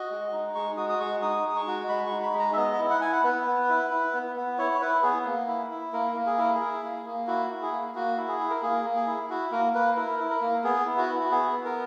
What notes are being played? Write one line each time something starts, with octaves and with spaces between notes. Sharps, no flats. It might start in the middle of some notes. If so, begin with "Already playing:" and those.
Already playing: F#4 D#5
G#3
D#4
G#3 C#6
F#4 D#6
D#6
G#3 C#6
D#4 D#6
G#3 D#6
C#6
F#4
G#3 B5
C#6
D#4
B5
G#3
A#5
E5
B3 D#5
E4
F#5
E4 G#5
F#5
B3 B4
B3
E4
E4
B3
B3
E4 C#5
C#5
E4 B4
B3 G#4
A#3
E4
E4
A#3 A#4
A#3
G#4
E4 A#4
G#4
E4
A#3
A#3
E4 F#4
E4
G#4
A#3
A#3 F#4
E4
G#4
E4
A#4
A#3 G#4
A#3
G#4
E4
E4 F#4
A#3 A#4
A#3 B4
E4 A#4
E4
A#4
A#3
B3 G#4
E4
F#4
E4
F#4
B3 G#4
B3
A#4